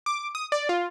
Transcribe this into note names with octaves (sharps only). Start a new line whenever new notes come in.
D6
D#6
D5
F4